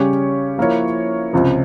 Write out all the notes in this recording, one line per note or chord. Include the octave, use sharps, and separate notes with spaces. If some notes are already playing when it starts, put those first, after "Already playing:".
Already playing: C#3 G3 C#4 G4 C#5
F3 A#3 E4 A#4 C#5
C#2 C3 F3